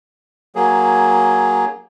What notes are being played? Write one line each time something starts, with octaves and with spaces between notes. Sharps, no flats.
F#3 A#3 G#4